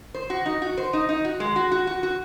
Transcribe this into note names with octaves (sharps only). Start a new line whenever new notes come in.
C5
F#4
D#4
F#4
C5
D#4
D#4
F#4
G#3
F#4
F#4
F#4
F#4